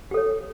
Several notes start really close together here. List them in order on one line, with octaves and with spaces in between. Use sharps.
G4 A4 C#5